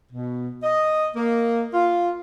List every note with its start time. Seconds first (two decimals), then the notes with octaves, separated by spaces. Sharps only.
0.11 B2
0.63 D#5
1.16 A#3
1.74 F4